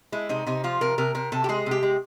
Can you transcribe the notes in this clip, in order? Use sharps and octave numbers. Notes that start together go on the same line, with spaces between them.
G#3 E4
C3 D#4
C3 D#4
F3 F4
C3 A#4
C3 A#4
C3 A#4
C3 A4
G4
G#3 G#4
C3 G4
G#3